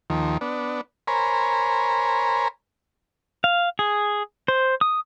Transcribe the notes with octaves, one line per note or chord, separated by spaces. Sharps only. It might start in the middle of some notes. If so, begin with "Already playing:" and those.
D#2 D#3 F3
B3 D4
A#4 C5 C#5 G#5 A#5 B5
F5
G#4
C5
D#6